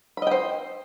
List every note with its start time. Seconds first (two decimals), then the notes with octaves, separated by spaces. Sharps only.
0.17 B5
0.22 D#5
0.27 G5
0.31 C5